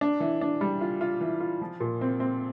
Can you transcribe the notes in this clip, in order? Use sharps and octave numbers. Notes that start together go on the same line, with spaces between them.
D4
E3
D4
G3
F4
F4
E3
F4
F3
A#2
C4
C4